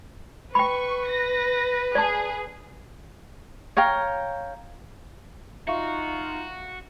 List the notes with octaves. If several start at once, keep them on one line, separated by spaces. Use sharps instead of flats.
B4 G5 B5 C#6
A#6
G#4 D5 A5
C#5 F5 G5 A#5
D#4 F4 F#4 E5 F5 C#6